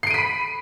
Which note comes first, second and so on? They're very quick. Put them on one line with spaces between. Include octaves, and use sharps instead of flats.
C7 D7 D#7 B6 B5